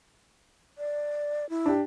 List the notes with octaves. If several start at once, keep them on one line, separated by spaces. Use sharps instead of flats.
D5
E4
D4 G4